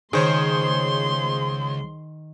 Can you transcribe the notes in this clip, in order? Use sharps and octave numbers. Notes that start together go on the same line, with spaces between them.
C#2 D#3 G#4 C5 C#5 C6